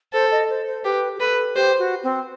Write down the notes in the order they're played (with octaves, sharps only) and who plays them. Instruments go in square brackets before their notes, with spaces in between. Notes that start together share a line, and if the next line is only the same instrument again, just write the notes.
[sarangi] A4 [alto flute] C5
[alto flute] D#5
C5
C5
[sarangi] G4 [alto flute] B4
[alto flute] G4
[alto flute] A4 [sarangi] B4
[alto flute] G4 [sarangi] C5
[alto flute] F#4
C4